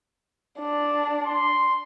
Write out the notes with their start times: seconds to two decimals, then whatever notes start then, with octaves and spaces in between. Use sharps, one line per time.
0.60 D4
1.26 C6